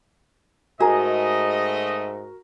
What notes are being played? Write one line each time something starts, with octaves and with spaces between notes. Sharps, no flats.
G#2 A3 F#4 G#4 A#4 D#5 A#5